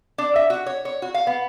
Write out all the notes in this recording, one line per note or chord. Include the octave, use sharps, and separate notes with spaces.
D4
E5
F#4
C#5
C#5
F#4
F5
B3